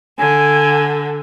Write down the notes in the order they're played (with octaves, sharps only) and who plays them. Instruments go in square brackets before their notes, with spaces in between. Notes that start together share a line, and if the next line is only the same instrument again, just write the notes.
[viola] D3 [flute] G#5